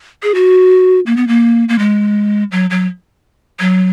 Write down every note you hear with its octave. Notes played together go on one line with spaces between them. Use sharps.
G#4
F#4
A#3
B3
A#3
A#3
G#3
F#3
F#3
F#3